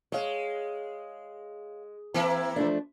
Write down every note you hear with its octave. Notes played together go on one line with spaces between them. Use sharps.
G#3 C#5 F5
E3 A#3 C4 E4
F3 A3 D4